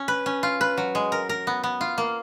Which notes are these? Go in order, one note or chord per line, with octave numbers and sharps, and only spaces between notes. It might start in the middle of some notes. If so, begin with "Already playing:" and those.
Already playing: C#4
B4
C#4
F4
B4
F#3
G#3
A#4
A#4
B3
B3
F4
A#3